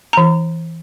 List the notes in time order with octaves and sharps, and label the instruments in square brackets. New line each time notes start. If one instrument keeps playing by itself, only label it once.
[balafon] E3 A#5